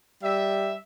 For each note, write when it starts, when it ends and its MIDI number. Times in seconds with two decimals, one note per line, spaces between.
0.23 0.77 55
0.23 0.76 76